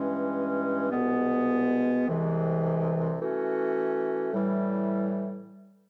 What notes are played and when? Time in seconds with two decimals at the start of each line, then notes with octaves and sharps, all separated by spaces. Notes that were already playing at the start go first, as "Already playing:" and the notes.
Already playing: G2 E3 G#3 C#4
0.91 C2 B2 G#3 B3
2.06 C2 C3 E3 G#3
3.19 E3 A3 C#4 F#4
4.33 A2 E3 G3